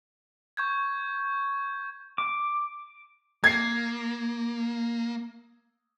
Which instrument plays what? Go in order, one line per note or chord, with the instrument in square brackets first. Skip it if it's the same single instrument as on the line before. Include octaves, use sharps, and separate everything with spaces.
[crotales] C#6 G6 G#6
[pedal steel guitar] D6
[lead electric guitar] A#3 [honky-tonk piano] G#6 C7